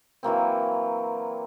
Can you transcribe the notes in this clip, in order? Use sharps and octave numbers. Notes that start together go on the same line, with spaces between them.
E3 F#3 A#3 C4